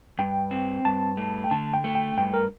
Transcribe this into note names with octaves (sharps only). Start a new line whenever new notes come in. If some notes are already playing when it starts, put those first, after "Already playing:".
G2 G5
C4
G2 A5
A3
G5
D3 A5
G5
A3
G5
G2 G5
A#4